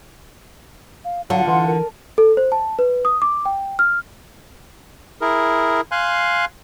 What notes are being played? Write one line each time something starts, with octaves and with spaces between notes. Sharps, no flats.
F5
D3 F#3 F4 F5 F#5
E3 C6
A#4
A4
C5
A5
B4
D#6
D6
G5
F6
E4 G#4 A#4
F5 G#5 C6 F#6